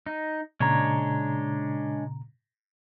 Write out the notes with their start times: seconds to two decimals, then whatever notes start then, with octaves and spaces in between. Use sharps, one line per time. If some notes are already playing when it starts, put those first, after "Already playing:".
0.06 D#4
0.60 A#2 C#3 G#3 D4 C#5 A#5